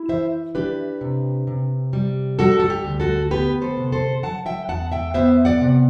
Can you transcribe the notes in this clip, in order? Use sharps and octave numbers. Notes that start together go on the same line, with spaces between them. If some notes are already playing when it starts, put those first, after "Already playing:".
Already playing: E4
E3 C5 E5
D4 G4 B4
C3
C3
G3
G3 F#4 A4
A4
G4
D2
F#4 A4
B3 G4 B4
A4 C5
C3
A4 C5
F#3 F#5 A5
E5 G5
E2 F#5 A5
E5 G5
B3 C5 E5
D5 F#5
C3